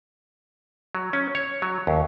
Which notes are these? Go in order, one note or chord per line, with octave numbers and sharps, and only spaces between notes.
F#3
C#4
C#5
F#3
D#2